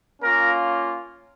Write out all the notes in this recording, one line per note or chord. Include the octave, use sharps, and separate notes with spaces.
A#3 C#4 F4 A#4